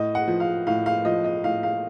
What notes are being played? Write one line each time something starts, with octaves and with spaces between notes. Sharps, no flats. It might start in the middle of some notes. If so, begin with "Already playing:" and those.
Already playing: A2 D#5
F#5
F3
F5
A2 F5
F5
F3 D#5
D#5
A2 F5
F5